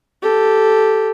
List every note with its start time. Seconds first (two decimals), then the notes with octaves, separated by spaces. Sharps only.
0.22 G4 A4